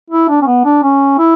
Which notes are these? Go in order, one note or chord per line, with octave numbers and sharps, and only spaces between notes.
E4
D4
C#4
B3
D4
C#4
E4